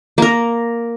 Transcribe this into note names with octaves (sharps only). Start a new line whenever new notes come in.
A#3 A#4